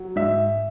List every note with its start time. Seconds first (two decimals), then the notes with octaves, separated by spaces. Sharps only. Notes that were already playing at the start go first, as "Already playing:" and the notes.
Already playing: F#3
0.16 G#2 E5